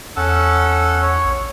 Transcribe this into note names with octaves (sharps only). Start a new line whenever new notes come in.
E2 C#4 A4 F#5
C#5
A#1